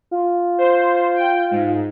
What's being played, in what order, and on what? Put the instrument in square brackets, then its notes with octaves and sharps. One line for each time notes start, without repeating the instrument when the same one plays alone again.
[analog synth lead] F4
[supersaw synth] C5
G5
G#2